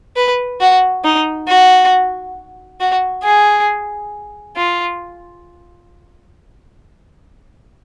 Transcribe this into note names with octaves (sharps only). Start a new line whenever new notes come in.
B4
F#4
D#4
F#4
F#4
G#4
F4